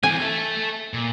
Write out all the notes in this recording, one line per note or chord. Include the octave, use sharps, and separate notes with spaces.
E3 C4 G#5
A4 E5
A#2